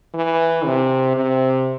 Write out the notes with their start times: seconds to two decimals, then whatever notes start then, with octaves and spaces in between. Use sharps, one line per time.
0.14 E3
0.65 C3
1.16 C3